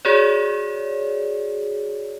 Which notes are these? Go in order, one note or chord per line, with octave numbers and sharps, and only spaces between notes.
F#4 G#4 C#5 D5